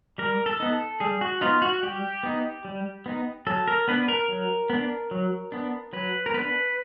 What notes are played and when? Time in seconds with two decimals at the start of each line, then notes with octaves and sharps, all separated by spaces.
0.18 G3 A#4
0.46 A4
0.60 B3 D#4
0.73 A4
1.00 G3 G#4
1.21 F#4
1.41 B3 D#4 F4
1.62 F#4
1.83 G3 G4
2.23 B3 D#4
2.65 G3
3.06 B3 D#4
3.47 F#3 A4
3.68 A#4
3.88 B3 D4 B4
4.08 A#4
4.29 F#3
4.70 B3 D4
5.11 F#3
5.52 B3 D4
5.93 F#3 B4
6.26 A#4
6.34 B3 D4 B4